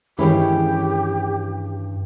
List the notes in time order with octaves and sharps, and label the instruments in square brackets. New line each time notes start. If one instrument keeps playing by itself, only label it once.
[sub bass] G2 [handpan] D#3 E3 [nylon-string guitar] G#3 C#4 E4 [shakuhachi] G4